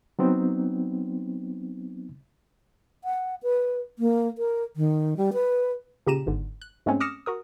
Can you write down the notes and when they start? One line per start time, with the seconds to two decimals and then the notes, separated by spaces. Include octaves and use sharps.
0.19 F#3 B3 C4 D#4
3.04 F#5
3.43 B4
3.99 A#3
4.38 A#4
4.77 D#3
5.17 G3
5.33 B4
6.07 A#2 C#3 G4 A#5 D#7 E7
6.27 G1 G#2 D3
6.61 F#6
6.86 G#2 G#3 A3 C4 C#4
7.00 D6 D#6 F6 A#6 C#7 E7
7.26 F#4 A#4 D#6